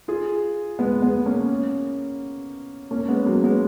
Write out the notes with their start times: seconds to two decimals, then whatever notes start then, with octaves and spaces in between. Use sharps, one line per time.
0.08 F4 G#4
0.79 G#3 B3
1.02 G#3 B3
1.26 A#3 C#4
2.91 A#3 C#4
3.08 G#3 B3
3.26 F#3 A#3
3.44 G#3 B3